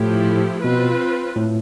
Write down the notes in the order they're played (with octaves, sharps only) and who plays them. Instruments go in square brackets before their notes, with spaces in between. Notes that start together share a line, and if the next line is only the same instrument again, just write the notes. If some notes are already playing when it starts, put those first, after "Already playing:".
Already playing: [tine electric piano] A2 [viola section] F3 A3 E4 G4
[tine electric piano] B2 [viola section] C4 F4 B4
[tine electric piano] A2